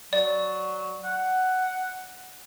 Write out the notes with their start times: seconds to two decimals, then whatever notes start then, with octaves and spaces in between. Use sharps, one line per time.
0.13 F#3 D5
1.04 F#5